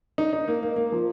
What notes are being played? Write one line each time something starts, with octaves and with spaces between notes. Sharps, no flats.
D#4
D#4
A#3
A#3
A#3
F3